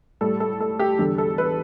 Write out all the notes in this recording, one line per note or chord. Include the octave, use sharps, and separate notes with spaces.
A2 G3 A4
A4
A4
G4
E2 D3 G3 A4
A4
B4